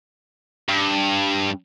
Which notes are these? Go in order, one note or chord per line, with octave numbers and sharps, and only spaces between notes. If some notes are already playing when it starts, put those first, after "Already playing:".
G2